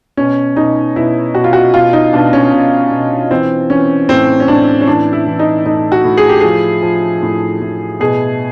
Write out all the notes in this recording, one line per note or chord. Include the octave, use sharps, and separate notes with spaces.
B2 C#4
B2 D#4
B2 E4
B2 F#4
F4
F#4
B2 F4
D#4
B2 D4
C#4
B2
B2
E3 C4
E3 C#4
A2 C4
C#4
A2 D4
C#4
E3 D4
E4
E3
D#4
A2 D#4
F#4
A2
G#4
G4
F3 G#4
F3
A2
A2
B2 G#4